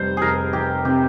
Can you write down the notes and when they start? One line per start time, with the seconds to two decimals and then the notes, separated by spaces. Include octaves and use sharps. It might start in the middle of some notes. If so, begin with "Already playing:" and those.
Already playing: F1 G3 C5
0.17 F1 G#4 A#4
0.53 F1 G4
0.85 C3 G4